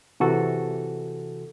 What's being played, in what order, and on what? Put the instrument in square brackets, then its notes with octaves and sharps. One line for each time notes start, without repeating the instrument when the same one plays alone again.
[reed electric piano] C3 E3 F#4 A4